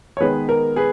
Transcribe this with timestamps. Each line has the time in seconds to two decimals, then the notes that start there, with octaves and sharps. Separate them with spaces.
0.17 C#5
0.21 D#3 G#3 B3 G#4 B4
0.49 A#4
0.76 G#4 B4